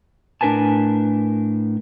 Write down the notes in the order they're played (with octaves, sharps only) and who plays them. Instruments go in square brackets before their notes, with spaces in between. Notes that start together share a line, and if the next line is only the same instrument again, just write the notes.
[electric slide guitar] A2 D4 A#4 B4 G#5 A5